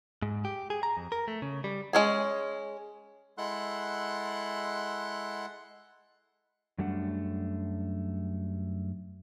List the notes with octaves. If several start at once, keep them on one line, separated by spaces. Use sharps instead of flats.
G#2
G4
G#4
A#5
F2
A#4
A3
C#3
G3
G#3 C#4 G#4
G#3 E4 A4 F#5 C6 F#6
F#2 G3 A3 D4 F#5